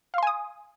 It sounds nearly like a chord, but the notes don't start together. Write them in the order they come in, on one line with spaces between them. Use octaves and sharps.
F5 C6 G#5 D#6